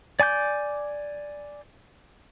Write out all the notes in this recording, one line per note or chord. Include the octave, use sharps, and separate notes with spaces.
D5 G#5 D6 G6